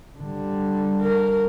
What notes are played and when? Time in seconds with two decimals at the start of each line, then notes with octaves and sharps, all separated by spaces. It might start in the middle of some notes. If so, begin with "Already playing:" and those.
0.18 D3 G3
1.01 A#4